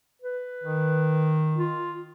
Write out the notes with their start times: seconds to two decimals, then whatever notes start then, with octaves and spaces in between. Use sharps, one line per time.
0.22 B4
0.63 D#3
1.58 F4